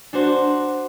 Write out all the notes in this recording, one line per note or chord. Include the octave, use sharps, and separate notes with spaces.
D4 F#4 C5